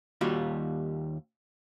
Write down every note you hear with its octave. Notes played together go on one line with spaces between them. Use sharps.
D#2 G3 F4 F#4